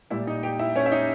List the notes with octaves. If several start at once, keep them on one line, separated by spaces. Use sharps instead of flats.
A#2 G3 E4 E5
D#4 D#5
G4 G5
E4 E5
C#4 C#5
E5
D#4 D#5